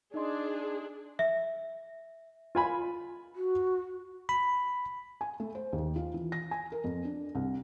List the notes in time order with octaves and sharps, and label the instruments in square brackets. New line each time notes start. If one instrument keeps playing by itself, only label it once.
[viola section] D4 G#4 [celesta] D#4 D#5 C6
[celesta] E5
[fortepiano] F4 G#5 B5
[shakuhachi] F#4
[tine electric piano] B5
[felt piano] G#5
A3
C5
D#2
F4
E3
A#6
G#5
A#4
F2
D4
C2